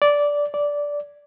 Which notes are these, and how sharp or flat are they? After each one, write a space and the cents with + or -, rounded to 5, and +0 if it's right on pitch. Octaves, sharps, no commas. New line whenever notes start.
D5 -10
D5 -10